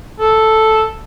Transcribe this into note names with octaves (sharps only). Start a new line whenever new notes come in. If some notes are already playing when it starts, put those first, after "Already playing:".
A4